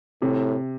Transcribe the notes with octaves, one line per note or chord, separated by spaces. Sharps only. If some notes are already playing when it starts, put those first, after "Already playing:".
A2 C3